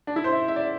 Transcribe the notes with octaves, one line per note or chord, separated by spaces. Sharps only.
D4
E4
C5
E5
E5
D5